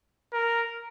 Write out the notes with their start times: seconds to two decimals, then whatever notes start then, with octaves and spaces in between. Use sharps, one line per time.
0.33 A#4